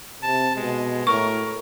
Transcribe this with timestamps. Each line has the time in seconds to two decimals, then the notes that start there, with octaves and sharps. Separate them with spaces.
0.23 C3 A5
0.56 B2 G#3
1.07 A2 A#4 C#6